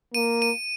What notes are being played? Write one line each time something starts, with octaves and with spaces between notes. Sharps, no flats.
A#3 D#7
D#7